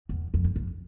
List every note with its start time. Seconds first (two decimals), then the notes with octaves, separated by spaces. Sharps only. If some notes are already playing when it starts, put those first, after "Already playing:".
0.09 E2
0.34 F2
0.44 G2
0.56 F2